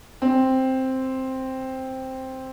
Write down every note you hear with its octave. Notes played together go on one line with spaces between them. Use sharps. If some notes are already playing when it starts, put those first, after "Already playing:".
C4